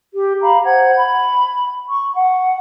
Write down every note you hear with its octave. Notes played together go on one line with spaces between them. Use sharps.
G4
F5 A#5 B5
C5 F#5 G#6
B5
C#6
F#5